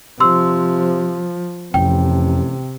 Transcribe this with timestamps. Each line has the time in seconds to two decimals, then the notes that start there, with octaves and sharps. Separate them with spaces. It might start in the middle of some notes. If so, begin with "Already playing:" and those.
0.20 C3 F3 C6 E6
1.74 A1 F2 C3 G5